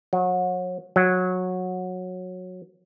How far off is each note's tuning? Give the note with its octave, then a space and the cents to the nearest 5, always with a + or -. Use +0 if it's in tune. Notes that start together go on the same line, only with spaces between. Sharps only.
F#3 -30
F#3 -15